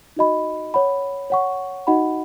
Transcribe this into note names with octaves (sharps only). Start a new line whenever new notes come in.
D#4 F#4 D#5 B5
C#5 F#5 B5
C#5 F#5 C#6
D#4 F#4 D#5 F#5 B5